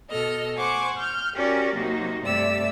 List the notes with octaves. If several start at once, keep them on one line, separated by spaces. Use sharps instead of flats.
B2 A4 D#5 F6
C5 F#5 G#5 C#6 D6
F6 G6
C#4 F#4 G4 A#4 D5
C3 F#3 A#3 D#4 F#4
G2 C3 A3 D5 E5 E6